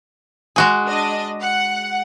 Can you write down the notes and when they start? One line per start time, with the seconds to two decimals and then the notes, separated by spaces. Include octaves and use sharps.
0.56 G#3 F#4 G#4
0.87 D4 D#5
1.40 F#5